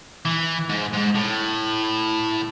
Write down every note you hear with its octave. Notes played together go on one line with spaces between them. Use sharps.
E3
G#2
G#2
A2